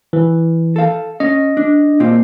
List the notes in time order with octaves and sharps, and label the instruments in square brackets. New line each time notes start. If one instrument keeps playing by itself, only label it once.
[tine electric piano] E3
[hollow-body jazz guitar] A4 F5
[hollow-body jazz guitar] C#4 [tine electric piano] D#5
[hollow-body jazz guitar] D4
A#2 C4 F4